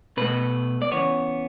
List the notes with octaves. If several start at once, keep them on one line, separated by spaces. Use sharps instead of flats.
B2 A3 B4
D5
C#3 E3 B3 C#5